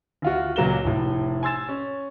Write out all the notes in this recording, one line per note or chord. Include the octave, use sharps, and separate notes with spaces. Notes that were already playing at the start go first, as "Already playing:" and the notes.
D2 F4 F#4
C#2 A#2 F#3 A#3 E7 G7
F1 A2
G#5 C6 E6 A6 E7
C#4